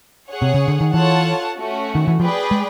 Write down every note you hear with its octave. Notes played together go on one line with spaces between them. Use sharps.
G#4 C#5 F#5
C3
C#3
D3
D#3
E3 F4 A4 C#5 F#5 A5
A3 C#4 F#4
D#3
E3
F3 G#4 B4 D5 G5
G#3